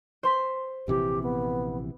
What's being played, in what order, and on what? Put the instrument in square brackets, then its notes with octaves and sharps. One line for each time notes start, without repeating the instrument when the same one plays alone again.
[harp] C5 C6 B6
[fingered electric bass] A#1 C3 E3 [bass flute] G4
[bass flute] B3